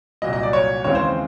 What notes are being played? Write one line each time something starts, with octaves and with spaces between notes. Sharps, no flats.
C2 A#2 F#3 D#5
D#5
D5
C#5
D#2 C#3 E3 G#3 C4 C#5
C5